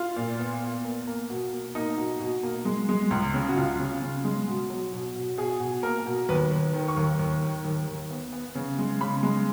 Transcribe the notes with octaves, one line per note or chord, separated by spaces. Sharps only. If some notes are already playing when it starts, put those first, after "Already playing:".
Already playing: F4
A#2
B3
B3
A#3
A#3
B2
A#3
A#3 D#4
B2
B2
A#3
G#3
G#3
C#2
C#3
F#4
C#2 F4
C#3
C#3
G#3
B2
F#3
B2
B2
B2 G#4
B2
A#3 A#4
B2
D#2 B4
D#2
D#3
C#6
D#2
D#2
D#3
D#2
D#2
B3
B3
C#3
G#3
C#3 B5
G#3